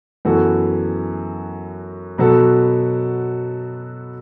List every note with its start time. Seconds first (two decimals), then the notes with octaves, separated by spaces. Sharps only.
0.25 F#2 E3 B3 F#4 A4
2.18 B2 F#3 B3 F#4 A4